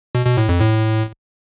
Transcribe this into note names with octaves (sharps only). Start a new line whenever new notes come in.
B2
B2
A2
F2
A2